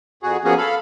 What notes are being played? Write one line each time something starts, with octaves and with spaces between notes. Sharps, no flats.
F2 F#4 G#4
F3 A#3 B3 C#4 F#4 G#4
A4 F5 B5